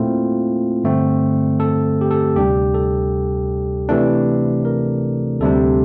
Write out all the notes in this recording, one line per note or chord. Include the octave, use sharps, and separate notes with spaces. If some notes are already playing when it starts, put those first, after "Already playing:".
Already playing: A#2 A3 C4 E4 F4
G2 D3 A3 C4
A4
G4
A4
D2 C3 G3 D4 G4
A4
C3 E3 A3 D4
A#4
D2 C3 G3 D4 A4